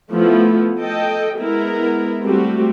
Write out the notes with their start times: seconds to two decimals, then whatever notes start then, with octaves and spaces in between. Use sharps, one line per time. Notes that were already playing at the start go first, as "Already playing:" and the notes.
0.12 F3 A3 B3 E4
0.80 A4 D#5 G5
1.39 G#3 B3 E4 A#4
2.23 G3 A3 C4 F#4 G4